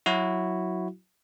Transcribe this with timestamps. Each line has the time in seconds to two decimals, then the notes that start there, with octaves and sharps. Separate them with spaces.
0.06 F#3 E4 F#4